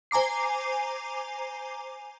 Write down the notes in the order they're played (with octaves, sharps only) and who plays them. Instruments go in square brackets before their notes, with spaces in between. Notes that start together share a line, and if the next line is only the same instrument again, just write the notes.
[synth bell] C5 G#5 A#5 D6 C7